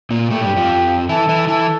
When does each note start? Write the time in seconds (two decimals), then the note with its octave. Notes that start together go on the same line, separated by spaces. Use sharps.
0.10 A#2 A#3
0.30 A2 A3 G4
0.44 G2 G3
0.57 F2 F3
1.09 E3 E4 A4
1.29 E3 E4
1.48 E3 E4 A4